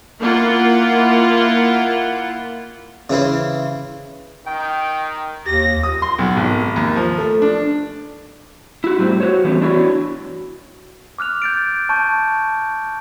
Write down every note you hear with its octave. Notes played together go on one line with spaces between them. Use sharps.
A#3 E4 F4 F#5
C#3 E3 E4 C5
D#3 G5
D#2 G4 A#6
D#6
C6
B1
G#1
D#2
F3
A3
D4
E4 F#4
A2 G3 A#3 C4
F#4 G4 C5 C#5
E3 G3 A3 B3 C#4
D4 E4 F#4 C#5
D6 F6 F#6 F7
G6 A6 D7
A5 C#6 G6